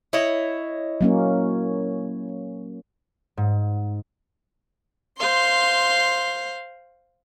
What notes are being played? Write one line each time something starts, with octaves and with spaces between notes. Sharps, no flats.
E4 C#5 D#5
F#3 A#3 C#4
G#2
C5 F5 C6